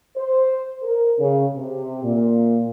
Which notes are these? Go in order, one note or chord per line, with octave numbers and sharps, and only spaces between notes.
C5
A#4
C#3
C3
A#2